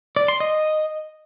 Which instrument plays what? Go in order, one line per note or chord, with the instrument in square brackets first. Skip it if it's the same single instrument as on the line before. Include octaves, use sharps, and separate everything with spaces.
[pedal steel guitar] D5
C6
D#5